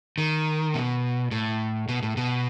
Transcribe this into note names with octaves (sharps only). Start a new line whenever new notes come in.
D#3
B2
A2
B2
A2
B2